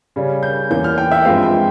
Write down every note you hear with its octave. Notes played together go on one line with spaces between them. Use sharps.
C#3 G3 C#4
G6
E2 E3 A#3 C#4 G6
F6
G5
E5
G2 F3 G#3 C4 F5
G5